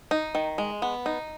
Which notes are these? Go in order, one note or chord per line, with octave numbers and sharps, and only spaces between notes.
D#4
D#3
G#3
B3
D#4